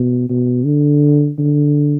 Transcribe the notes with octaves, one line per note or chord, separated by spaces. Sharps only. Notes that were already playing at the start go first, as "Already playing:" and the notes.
Already playing: B2
B2
D3
D3